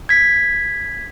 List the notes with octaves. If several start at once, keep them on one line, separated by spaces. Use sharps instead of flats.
G#6 B6